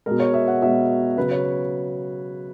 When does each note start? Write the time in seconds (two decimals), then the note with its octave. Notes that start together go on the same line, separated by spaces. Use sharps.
0.06 B2 G#3 A#4
0.20 C#5
0.34 E5
0.48 F#5
0.62 B2 G#3 E5
1.17 C#3 F#3 B4
1.31 C#5